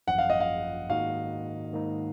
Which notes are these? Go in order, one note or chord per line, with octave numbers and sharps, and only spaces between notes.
G#1 F#2 F3 F#5
F5
D#5
F5
G#2 D#3 A#3 D#4 F#4 F5
G#2 D#3 A#3 D#4